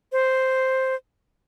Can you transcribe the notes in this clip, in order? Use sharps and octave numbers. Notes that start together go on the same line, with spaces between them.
C5